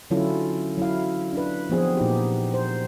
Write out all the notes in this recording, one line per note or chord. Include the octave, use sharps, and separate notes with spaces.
D3 F#3 C#4 E4 F4 A4
F#3 E4 F5
D4 B4
F3 B3 C4 G#4
A#2 D#4 G4
C5